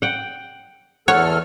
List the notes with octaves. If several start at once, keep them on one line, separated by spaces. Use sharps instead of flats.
F#5 G5
E2 A4 C#5 F#5 F6